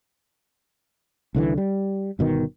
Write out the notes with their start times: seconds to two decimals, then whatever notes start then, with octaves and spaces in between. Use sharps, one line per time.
1.35 C2 D3 E3
1.57 G3
2.19 G1 B2 D#3